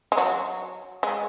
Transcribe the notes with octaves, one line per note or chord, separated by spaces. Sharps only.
G#3
F#3
G#3